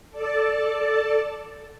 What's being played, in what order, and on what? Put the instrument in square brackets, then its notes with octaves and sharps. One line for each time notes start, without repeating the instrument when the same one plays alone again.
[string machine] A4 D5 A5